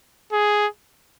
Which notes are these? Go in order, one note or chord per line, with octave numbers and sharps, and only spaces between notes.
G#4